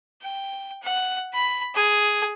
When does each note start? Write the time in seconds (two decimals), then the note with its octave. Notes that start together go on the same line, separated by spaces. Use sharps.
0.22 G5
0.83 F#5
1.34 B5
1.75 G#4